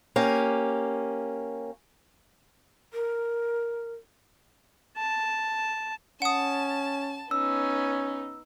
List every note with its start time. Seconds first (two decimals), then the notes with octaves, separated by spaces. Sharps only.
0.16 A#3 C#4 G4
2.92 A#4
4.97 A5
6.22 C#4 F#5 A5 D#6
7.31 B3 C#4 D#4 E6